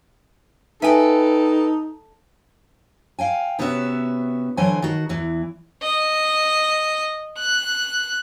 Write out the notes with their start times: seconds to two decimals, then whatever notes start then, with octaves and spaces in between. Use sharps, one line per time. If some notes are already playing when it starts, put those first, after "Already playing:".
0.82 D#4 A4 B4 E5 G5 G#5
3.19 F5 G5 G#5
3.59 C3 B3 C#4 F#4 A#4 E5
4.57 D3 E3 F#3 C5 F#5 G#5
4.82 D#3 F#4
5.09 E2 E3
5.83 D#5
7.38 F#6